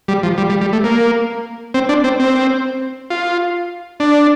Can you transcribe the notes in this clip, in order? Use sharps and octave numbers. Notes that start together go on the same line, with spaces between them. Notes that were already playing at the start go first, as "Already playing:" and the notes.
G3
F3
G3
G3
G3
A3
A#3
C4
D4
C4
C4
F4
D4